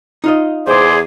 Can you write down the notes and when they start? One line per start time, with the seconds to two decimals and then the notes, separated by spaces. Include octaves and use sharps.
0.24 D#4 F4 D#5
0.67 E2 G#4 C5 D5